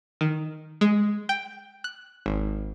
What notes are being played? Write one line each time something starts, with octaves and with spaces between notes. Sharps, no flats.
D#3
G#3
G5
F#6
G#1